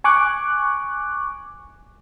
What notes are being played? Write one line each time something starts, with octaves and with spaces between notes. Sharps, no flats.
G#5 C#6 D6 F#6